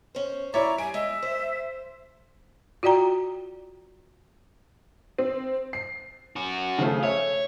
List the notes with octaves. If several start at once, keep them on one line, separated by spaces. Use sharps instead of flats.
C#4 C5
E4 C#5 D5 E5 A#5
G3 G#5 D7
G#3 E5
C5
F4 F#4 D5 G5 A#5
C4
C7
C#4 F#4
C#3 F3 A3
C#5 E5